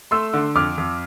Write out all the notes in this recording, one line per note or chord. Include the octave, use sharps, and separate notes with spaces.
A3 C6 E6
D3
F2 D6 F6
F2